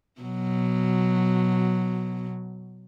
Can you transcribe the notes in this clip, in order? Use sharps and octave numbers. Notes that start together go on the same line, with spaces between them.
B2 F#3